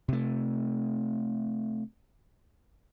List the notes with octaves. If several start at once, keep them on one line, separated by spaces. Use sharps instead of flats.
C3 A3